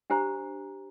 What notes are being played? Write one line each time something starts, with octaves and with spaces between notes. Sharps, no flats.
D4 G4 C5 A#5